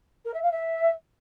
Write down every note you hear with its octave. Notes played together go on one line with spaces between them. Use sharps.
A#4
E5
F5
E5